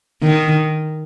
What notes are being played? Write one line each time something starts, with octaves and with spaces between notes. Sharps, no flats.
D#3